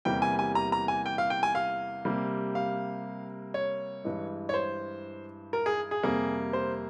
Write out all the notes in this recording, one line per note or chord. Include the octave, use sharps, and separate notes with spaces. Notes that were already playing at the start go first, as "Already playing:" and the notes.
E2 C3 E3 G3 A#3 G5
G#5
G#5
A#5
A#5
G#5
G5
F5
G5
G#5
F5
C3 G3 A#3
F5
C#5
G2 E3 G#3
C#5
C5
A#4
G#4
G#4
F2 C3 G3 A#3
C5